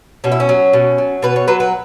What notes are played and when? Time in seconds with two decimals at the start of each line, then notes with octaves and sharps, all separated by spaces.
0.24 B2 C#4
0.32 E4
0.40 C#4
0.49 F#3
0.73 B2
0.98 F#3
1.22 B2 B4
1.36 C#5
1.48 F#3 B4
1.60 B4